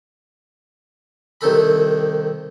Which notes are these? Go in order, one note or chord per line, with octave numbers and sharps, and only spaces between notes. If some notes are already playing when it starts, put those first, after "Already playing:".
C2 C3 D#3 A4 B5